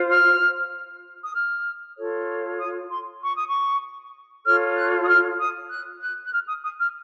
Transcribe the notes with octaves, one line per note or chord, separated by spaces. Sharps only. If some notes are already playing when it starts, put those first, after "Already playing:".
Already playing: F4 C5
F6
D#6
F6
F4 A4 C#5
D#6
C6
C#6
D#6
C#6
F4 A4 C#5 F6
F#6
D#6
F6
D#6
F#6
F#6
F#6
F6
D#6
D#6
F6